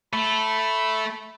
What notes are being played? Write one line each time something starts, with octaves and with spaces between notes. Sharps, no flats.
A3 B5